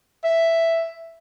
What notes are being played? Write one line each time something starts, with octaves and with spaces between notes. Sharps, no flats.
E5